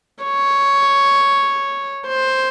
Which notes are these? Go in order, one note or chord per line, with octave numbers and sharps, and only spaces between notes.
C#5
C5